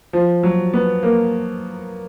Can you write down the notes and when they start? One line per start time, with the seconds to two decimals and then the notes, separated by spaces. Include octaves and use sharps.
0.13 F3
0.43 F#3
0.73 B3
1.03 A#3